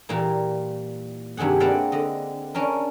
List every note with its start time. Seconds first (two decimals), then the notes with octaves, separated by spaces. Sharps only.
0.09 A#2 E3 G3 A#3
1.37 G2 C3 D#3 G#4 F#5
1.60 A#3 C4 B4 D5 F5 F#5
1.92 D3 D#5
2.55 C#4 D4 A#4